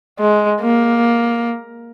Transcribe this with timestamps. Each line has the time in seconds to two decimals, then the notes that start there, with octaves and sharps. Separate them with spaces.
0.19 G#3
0.61 A#3